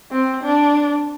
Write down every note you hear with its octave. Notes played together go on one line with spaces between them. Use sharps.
C4
D4